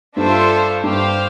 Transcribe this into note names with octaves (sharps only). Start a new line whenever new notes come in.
G2 D4 F4 A4 C5 E5
G2 G4 C5 F5